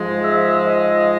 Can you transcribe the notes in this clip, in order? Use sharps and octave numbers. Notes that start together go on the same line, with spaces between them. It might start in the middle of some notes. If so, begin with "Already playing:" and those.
Already playing: G#2 F3 G#3
E5
D#5